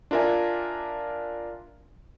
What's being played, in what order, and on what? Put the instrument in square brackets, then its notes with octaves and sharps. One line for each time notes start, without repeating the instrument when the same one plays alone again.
[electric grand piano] D4 F4 A#4 E5 G#5